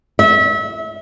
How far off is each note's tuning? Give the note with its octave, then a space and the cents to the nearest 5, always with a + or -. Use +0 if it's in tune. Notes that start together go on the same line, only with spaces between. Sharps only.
E5 -30